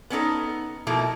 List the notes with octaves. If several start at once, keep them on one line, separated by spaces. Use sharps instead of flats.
B3 C#4 D#4 A4
B2 F3 A3 A#3 E4